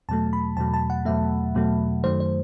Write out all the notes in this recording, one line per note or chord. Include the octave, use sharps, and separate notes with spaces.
E2 B2 F#3 A3 A5
B5
E2 B2 F#3 A3 A5
A5
F#5
E2 B2 F#3 A3 E5
E2 B2 F#3 A3
F#2 D#3 F#3 A3 C5
C5